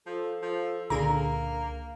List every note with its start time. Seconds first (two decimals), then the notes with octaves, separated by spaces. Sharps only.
0.06 F3 A4
0.42 F3
0.90 C#2 A#2 D3 A#3 D4 G#4 A#5